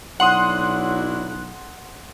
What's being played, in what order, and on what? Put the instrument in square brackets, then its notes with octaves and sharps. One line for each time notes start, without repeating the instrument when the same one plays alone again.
[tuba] B1 [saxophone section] F#3 D4 E4 [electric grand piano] F#5 C6 D#6 [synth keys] F#6